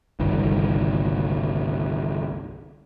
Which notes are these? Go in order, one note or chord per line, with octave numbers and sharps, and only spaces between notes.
G1 C2 D#3